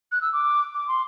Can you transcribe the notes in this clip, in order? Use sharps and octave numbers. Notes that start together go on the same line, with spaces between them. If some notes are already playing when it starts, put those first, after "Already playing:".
F#6
E6
D6
D6
C6